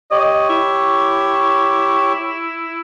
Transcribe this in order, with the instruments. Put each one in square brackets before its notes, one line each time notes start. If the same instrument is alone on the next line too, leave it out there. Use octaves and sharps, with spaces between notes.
[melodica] G4 C#5 [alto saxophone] D#5
[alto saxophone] E4